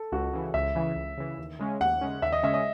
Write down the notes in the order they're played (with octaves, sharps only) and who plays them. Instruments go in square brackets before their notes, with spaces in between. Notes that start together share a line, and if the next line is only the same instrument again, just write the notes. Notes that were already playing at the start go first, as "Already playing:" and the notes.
Already playing: [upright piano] A4
[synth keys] C#2 [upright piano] F#4
[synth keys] C#3 E3
[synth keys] C#2 [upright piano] E5
[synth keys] C#3 E3
C#2
C#3 E3
D#2
C#3 G#3 C#4
[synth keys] D#2 [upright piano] F#5
[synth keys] C#3 G#3 C#4
[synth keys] D#2 [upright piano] E5
[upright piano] D#5
[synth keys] C#3 G#3 C#4 [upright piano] E5
[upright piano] D#5